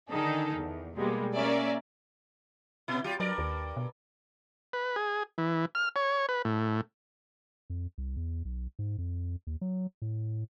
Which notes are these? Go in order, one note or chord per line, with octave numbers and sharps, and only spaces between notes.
D3 D#3 D#4 G#4 A4
E2
B2 G3 G#3 A#3
A#3 C#4 A#4 D5 E5 G#5
A#2 E4
F#3 F4 G4
G2 F#3 A#4 D5
D#2
B2
B4
G#4
E3
F6
C#5
B4
A2
F2
C2
E2
B1
G#2
F2
D#2
F#3
A2